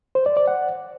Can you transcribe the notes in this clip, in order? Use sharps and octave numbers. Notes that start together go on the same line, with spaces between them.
C5
D5
D5
F#5